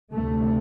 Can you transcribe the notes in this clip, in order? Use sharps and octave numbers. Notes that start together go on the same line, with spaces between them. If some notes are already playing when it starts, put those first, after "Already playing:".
D2 C3 A3